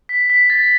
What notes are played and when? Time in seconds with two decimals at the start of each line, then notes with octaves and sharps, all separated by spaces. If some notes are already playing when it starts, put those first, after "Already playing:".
0.09 B6
0.30 B6
0.50 A6